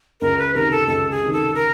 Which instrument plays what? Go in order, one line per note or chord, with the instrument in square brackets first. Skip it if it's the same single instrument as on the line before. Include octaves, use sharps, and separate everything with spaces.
[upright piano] C#2 [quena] A#4
[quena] B4
[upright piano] C3 D#3 [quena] A#4
[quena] A4
[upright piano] C#2 [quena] A4
[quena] G#4
[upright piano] C3 D#3
[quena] A4
A#4